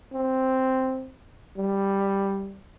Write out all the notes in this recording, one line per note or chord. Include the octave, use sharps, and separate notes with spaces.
C4
G3